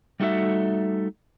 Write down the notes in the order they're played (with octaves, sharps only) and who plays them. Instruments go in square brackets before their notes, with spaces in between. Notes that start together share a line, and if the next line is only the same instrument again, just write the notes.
[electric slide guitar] G3 A3 D#4 F#4 A4 E5